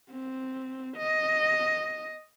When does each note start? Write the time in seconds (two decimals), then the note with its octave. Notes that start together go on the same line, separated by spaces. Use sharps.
0.11 C4
0.97 D#5